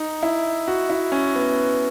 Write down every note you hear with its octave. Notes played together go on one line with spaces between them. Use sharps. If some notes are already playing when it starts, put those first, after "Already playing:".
Already playing: D#4
E4
F#4
E4
C#4
B3